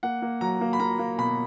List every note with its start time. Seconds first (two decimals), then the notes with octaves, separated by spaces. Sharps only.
0.03 A#3 F#5
0.22 A#3
0.41 F#3 A#5
0.61 A#3
0.73 B5
0.80 A#3 A#5
0.99 A#3
1.18 B2 B5